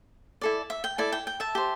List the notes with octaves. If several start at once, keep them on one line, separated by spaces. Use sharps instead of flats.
E4 A4 D5
E5
G5
E4 A4 D5
G5
G5
E5 A5
G4 C5